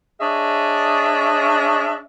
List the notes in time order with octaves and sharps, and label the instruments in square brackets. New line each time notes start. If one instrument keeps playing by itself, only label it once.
[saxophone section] D4 G#4 C#5 D#5 E5